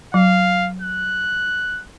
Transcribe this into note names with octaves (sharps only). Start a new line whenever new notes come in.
F#3 F5
F#6